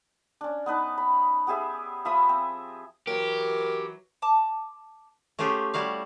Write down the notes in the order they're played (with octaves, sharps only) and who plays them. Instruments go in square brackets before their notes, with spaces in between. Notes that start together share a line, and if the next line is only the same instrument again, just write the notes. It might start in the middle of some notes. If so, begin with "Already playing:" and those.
[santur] C#4 D4
B3 D#4 B4 A5
B5
B3 G4 G#4 E5
F3 E5 B5 D#6
C4
[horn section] E3 F#3 [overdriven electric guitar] G4 [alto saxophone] A#4
[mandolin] A5 D6
[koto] A3 C#4 F4 G4 G#4
G3 E4 F#4 F5